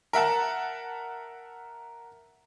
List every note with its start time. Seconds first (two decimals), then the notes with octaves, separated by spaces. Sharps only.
0.13 A#4 E5 F#5 A5